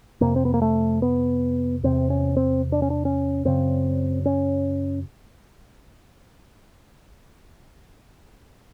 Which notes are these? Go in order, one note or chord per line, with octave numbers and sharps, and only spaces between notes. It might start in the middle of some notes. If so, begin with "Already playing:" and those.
F2 C3 A#3
C4
B3
A#3
A3
B3
E2 C3 C4
C#4
C4
D4
C#4
D4
C#4
F#2 C#3 C4
C#4